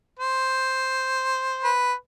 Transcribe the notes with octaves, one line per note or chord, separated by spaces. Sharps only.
C5
B4